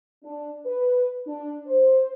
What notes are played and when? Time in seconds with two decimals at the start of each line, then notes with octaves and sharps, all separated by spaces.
0.23 D4
0.65 B4
1.26 D4
1.66 C5